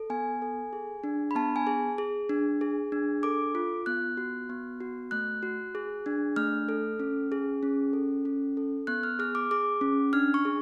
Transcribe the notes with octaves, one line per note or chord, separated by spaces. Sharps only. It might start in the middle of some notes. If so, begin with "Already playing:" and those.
Already playing: A4
B3 G#5
A4
G#4
D4
B5
B3 A5
G#5
G#4
G#4
D4
G#4
D4
A4 D6
F4
B3 F#6
F#4
B3
F#4
A3 F#6
F#4
G#4
D4
A3 F6
A4
C#4
G#4
C#4
A4
C#4
A4
B3 F#6
F6
G#4 F6
D6
G#4 D6
C#4
D4 F6
C#6
G#4